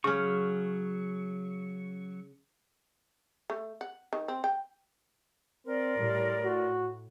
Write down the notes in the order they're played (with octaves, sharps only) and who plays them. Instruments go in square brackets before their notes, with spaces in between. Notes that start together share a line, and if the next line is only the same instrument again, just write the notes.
[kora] C#3 C#4 [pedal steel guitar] F#3 C#6
[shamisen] A3
F#5
D#3
C4
G5
[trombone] C4 [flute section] A#4 D5 C6
[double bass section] A2 [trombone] G3
[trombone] F#4